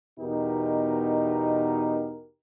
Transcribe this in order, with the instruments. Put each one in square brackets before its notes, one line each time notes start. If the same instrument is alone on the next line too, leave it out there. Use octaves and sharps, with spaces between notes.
[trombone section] E2 B2 D#4 G4 A#4